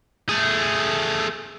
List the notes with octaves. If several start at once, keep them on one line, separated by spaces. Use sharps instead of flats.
A3 G#4